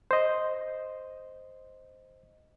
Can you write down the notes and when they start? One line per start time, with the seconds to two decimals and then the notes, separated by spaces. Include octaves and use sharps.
0.11 C5 D#5